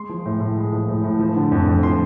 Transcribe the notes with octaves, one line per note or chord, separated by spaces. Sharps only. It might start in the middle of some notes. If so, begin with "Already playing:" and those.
Already playing: G#3 C6
F3
A2
A2
G#3
F3
A2
A2
F3
D3
F2
F2
F3 C6